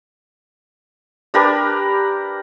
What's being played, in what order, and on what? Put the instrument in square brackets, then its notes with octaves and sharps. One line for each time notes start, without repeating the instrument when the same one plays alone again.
[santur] D4 G4 A#4 B4